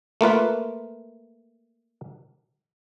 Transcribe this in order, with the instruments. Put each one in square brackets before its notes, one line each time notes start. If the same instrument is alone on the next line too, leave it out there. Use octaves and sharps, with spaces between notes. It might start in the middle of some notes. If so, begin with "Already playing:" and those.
[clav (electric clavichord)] A3 A#3 F4 B4